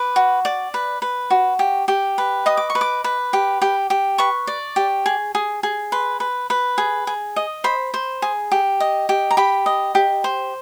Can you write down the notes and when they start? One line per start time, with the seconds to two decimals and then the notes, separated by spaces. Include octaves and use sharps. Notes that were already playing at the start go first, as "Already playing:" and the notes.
Already playing: B4 D6
0.16 F#4
0.45 D5
0.74 B4
1.02 B4
1.30 F#4
1.59 G4
1.88 G4
2.18 B4
2.46 D#5 D#6
2.57 D6
2.70 C#6
2.75 B4
2.81 D6
3.04 B4
3.33 G4
3.62 G4
3.90 G4
4.18 B4 C#6
4.47 D5
4.76 G4
5.06 G#4
5.35 G#4
5.63 G#4
5.92 B4 C6
6.20 B4
6.50 B4
6.78 G#4
7.07 G#4
7.36 D#5
7.64 C5 B5
7.94 C5
8.22 G#4
8.51 G4
8.80 D#5
9.09 G4
9.31 A#5
9.37 G4 B5
9.66 D#5
9.95 G4
10.24 C5